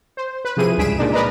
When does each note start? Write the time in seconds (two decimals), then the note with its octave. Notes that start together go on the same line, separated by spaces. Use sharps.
0.17 C5
0.45 B4
0.57 C3 F3 E4 G#4 D#7
0.78 C#2 G2 G#4 B6 D7 E7
0.98 A#2 G#3 D4 D#4
1.13 A#4 B4 D5 D#5 A#5